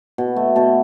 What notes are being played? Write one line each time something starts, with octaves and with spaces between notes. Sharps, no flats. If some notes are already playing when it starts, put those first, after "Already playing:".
B2
A3
B2 A4